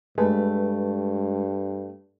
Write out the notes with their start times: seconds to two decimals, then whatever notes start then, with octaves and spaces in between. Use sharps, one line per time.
0.18 G2 G#3 A3 B4